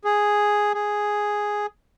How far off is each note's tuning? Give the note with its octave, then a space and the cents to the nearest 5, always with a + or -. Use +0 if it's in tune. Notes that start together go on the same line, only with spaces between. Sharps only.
G#4 +0
G#4 +0